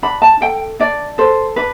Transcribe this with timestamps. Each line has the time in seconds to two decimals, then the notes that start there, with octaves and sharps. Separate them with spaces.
0.03 D4 B5
0.22 A5
0.41 A4 G5
0.80 D4 D5
1.18 A4 C5
1.56 D4 B4